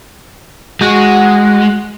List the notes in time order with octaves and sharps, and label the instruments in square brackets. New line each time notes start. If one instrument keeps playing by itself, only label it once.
[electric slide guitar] G#3 [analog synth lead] F#4